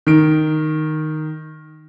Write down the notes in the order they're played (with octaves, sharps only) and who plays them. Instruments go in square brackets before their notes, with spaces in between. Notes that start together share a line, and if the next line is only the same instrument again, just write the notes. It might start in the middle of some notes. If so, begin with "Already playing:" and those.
[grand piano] D#3 D7